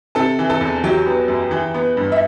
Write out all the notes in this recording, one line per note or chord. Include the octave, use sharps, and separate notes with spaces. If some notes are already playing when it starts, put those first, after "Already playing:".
C3 A4 A5
E3
A4 A5
E2
F#3 G4 G5
B3
F#2
E3
B3
G2
E5